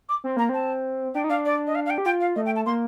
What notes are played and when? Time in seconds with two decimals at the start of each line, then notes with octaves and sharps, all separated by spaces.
0.09 D6
0.24 C4
0.37 A#3 A#5
0.49 C4 A5
1.15 D4 G5
1.24 D#4
1.30 D4 F5
1.45 D5
1.67 D#5
1.75 F5
1.86 F5
1.90 G5
1.98 G4
2.05 F4 G5
2.21 F5
2.36 A3 D#5
2.46 G5
2.56 A5
2.66 A#3 C6